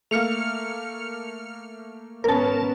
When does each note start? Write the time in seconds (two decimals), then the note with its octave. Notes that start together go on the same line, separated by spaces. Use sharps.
0.11 A3 A#3 F6 C#7 F7
2.24 G#1 B3 C#4 A#4 A5